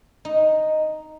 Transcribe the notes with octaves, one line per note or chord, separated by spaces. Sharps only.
D#4